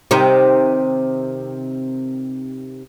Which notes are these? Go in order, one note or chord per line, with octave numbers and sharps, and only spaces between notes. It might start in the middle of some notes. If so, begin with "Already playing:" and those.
C3 D#3 D#4